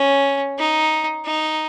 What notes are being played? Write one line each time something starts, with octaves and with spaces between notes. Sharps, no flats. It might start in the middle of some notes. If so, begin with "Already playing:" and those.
Already playing: C#4
D#4
D#4